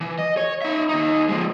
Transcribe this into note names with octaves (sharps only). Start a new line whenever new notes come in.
E3
D#5
C#5
D#4 E5
D#2 D#4
F3 G#3